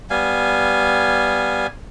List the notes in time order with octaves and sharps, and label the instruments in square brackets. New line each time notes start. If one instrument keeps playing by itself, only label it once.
[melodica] G3 B3 F5 G#5